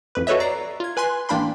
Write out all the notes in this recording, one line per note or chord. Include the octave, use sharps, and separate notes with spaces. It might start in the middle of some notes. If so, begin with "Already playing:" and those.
A1 F2 B4
F#4 A4 B4 C#5 D#5 E5
D5 A#5 C7
F4 G#6
B4 G#5 C6 F#6
A1 A#3 D4 G5 B5 C6